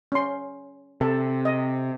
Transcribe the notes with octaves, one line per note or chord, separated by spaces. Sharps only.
C#4 C6
C3 A4
D#5